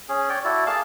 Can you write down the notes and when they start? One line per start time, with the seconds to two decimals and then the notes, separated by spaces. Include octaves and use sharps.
0.09 C#4 G#4
0.29 C#5 D5 G5
0.45 E4 F#4 A4 D5
0.66 A#3 G#4 F5 A5